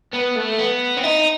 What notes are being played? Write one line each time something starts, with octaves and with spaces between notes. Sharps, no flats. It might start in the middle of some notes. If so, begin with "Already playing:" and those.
B3
A3
B3
C4
D#4